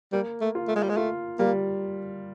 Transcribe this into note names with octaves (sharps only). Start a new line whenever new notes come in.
G3 A#3
A3
F4
A3
G#3
G3
G#3
A3 F4
G3 A#3